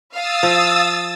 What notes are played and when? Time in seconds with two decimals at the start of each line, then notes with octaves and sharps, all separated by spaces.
0.13 F5 D#6 E6 A6
0.43 F3